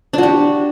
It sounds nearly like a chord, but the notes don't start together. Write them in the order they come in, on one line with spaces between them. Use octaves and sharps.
D4 F#4 G4